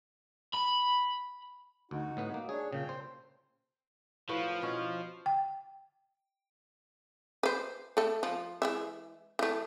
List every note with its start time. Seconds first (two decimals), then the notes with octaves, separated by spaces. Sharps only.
0.54 B5
1.91 D2 D#4 F#4
2.17 A2 B3 B4
2.34 A#3
2.49 D4 G#4 C#5
2.73 A#2 C#3 G5
2.89 C5
4.29 A2 F3 F#4 B4
4.62 B2 C#4 B4
5.26 G5
7.43 B4 C5
7.97 A3 A4
8.23 F3
8.62 E3 G#3 E5
9.39 E3 A3